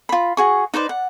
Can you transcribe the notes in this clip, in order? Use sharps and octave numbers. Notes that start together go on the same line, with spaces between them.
F4 B5
F#4 G#4 C#6
D#4 B4 C5 D5
F#5